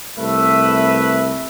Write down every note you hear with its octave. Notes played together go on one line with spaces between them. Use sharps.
C2 A3 B4 E5